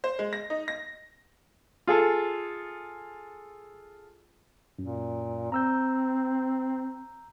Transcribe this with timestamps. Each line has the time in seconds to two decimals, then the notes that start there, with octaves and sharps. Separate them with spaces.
0.04 C5
0.19 G#3
0.33 A#6
0.50 D#4
0.68 A#6
1.87 F4 G#4 A4
4.79 F#2 A#2
5.52 C4 A#5 E6 G6